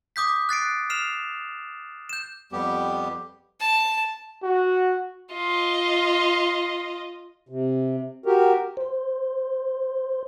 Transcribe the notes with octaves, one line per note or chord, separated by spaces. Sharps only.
D6 D#6 G6 B6
F#6 A6 C7 D7
F6 C7 E7 F7
G6 E7
F2 G3 B3 G4
A5
F#4
F4 D#5
C3
F#4 G4 A#4
C5